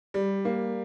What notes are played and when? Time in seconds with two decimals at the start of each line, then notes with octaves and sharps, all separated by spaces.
0.14 G3
0.45 A#3